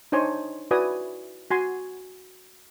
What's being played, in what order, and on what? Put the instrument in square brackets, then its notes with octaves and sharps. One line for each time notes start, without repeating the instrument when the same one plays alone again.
[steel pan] D4 D#4 C5 C#5 G#5
E4 F#4 B4 D5 G#5 D#6
F#4 G#5 C6